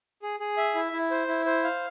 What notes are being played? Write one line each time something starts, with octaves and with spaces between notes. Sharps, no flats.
G#4
G#4
E5
E4
E4
C5
E4
C5
F5